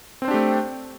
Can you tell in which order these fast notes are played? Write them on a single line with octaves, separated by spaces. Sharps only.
C4 C5 D4 G4 A3